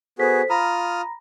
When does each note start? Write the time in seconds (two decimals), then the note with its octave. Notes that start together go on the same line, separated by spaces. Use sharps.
0.19 B3 F#4 G#4 A4 C5 B6
0.50 F4 A#5 B5 D#6 F6 A#6